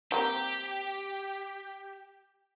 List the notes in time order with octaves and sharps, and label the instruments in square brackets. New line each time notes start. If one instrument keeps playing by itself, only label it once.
[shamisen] G3 A#3 C4 [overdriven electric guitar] G4